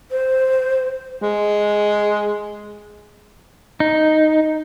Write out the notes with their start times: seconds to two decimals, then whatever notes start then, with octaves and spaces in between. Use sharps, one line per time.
0.11 C5
1.22 G#3
3.80 D#4